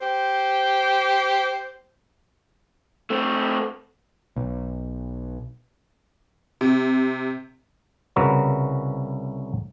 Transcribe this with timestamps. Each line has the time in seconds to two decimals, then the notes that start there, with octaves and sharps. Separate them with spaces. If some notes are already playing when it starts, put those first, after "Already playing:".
0.01 G4 C5
3.10 A3 C4
4.36 B1
6.61 C3
8.16 C2 C#3 F#4 A#4 B4 A#5